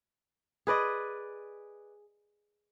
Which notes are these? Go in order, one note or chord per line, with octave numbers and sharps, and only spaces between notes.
G#4 B4 D5 D#5